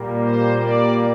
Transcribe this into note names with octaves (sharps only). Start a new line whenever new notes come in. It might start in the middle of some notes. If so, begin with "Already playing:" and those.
Already playing: A#2 G3 A#3
C5
D5